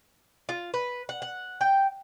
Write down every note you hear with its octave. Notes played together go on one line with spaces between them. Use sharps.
F4
B4
F#5
F#5
G5